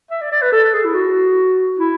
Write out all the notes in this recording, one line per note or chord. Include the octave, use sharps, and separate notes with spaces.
E5
D5
D5
B4
A4
G#4
E4
F#4
E4